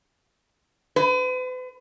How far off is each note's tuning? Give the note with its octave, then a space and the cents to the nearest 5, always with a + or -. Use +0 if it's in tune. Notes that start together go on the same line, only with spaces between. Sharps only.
B4 +45